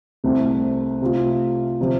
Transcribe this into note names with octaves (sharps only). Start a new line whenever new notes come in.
C2 C3 A3 C4
C3 A3 F4
C3 F3